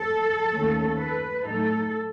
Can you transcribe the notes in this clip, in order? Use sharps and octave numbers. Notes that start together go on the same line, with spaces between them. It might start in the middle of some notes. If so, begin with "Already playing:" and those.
Already playing: A4
D#2 D#3 A3 C#4
B4
A2 F#3 A3 D#4 A4